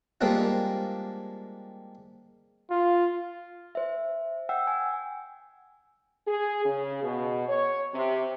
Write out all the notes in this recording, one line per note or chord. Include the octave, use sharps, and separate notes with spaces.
G3 G#3 A#3 C4 D4 F4
F4
C5 E5
F#5 G5 E6
G#5
G#4
C#3
B2
C#5
C3